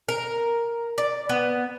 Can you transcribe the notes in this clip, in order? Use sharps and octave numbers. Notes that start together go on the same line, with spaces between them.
A#4
D5
B3